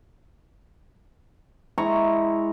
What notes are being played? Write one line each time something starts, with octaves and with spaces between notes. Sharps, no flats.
G#3 E4 A#5 C#6